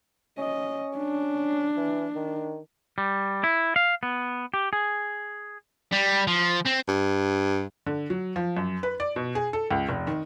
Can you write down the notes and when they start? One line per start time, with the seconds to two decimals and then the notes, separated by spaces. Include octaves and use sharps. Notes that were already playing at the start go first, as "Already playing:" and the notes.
0.39 C#4 D#5
0.97 D4
1.77 E3
2.16 D#3
2.98 G3
3.44 E4
3.76 F5
4.03 B3
4.54 G4
4.73 G#4
5.93 G3
6.27 F3
6.65 C4
6.88 G2
7.86 D3
8.10 F#3
8.36 F3
8.57 F#2
8.83 B4
9.00 D5
9.16 B2
9.35 G#4
9.53 A4
9.71 C#2
9.89 F1
10.07 D#3